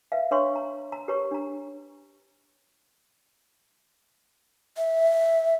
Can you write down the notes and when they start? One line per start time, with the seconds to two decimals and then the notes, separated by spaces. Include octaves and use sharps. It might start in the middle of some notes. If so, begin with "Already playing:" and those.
0.12 B4 E5 F5
0.31 D4 B4 C#5 C6 C#6
0.56 A#5
0.92 A#5
1.08 G4 A#4 B4 C#5 A#5 C#6
1.31 D4 A#5
4.77 E5